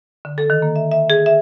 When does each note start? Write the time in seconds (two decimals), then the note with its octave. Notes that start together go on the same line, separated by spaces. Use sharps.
0.25 D3
0.38 A4
0.50 D#3
0.62 A#3
0.76 E5
0.91 E5
1.10 G#4
1.26 E5